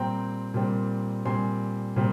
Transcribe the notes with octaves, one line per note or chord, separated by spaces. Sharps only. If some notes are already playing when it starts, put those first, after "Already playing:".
Already playing: A#2 G3 C4 G5 A#5
A#2 G3 C4
A#2 G3 C4 G#5 C6
A#2 G3 C4